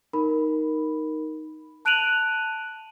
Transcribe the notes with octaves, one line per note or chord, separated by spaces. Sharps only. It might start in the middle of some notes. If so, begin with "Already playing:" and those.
D#4 A#4 B5
A5 F#6 D7 D#7 F7 F#7